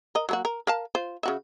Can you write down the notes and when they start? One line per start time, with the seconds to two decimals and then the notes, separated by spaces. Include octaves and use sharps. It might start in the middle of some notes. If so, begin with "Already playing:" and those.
0.15 A#4 D#5
0.29 F#3 A#3 F#4
0.45 A#4
0.67 A#4 F5 A5
0.95 F4 C5
1.23 C#3 F#4 E5